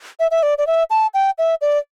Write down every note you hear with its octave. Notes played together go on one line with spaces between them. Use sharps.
E5
E5
D5
D5
E5
A5
G5
E5
D5